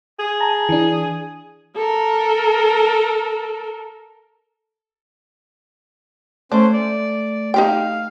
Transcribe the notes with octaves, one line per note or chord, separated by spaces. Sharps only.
G#4
A5 A#5
E3 D4
A4 A#4
A3 C#4 D4 C5
D5
D#4 G4 F5 G5